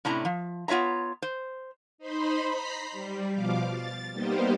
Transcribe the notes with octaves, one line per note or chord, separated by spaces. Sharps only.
A2 C3 C#4 D4 E4 A#5
F3
B3 F4 C#5 E5 A#5
C5
D#4 C5 B5 C6
A#5 B5 B6 C7
G3
B2 F3 F5 D6
A6
G3 A#3 B3 D#4 G4 C5